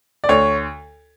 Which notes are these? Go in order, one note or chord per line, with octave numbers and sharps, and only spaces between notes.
D5
D2 C#5